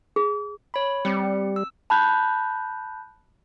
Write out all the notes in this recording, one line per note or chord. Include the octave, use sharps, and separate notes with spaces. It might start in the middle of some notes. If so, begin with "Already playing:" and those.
G#4
C#5 B5
G3 C4 C#7
E6
A5 B5 F#6 G6